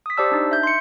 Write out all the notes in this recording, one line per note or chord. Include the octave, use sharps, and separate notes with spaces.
D#6 B6
G4 C5 D5 A5 E6
D4 D#4
E5 G6
C6 C#7